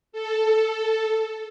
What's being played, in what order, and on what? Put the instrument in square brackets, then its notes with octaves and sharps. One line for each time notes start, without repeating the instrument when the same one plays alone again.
[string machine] A4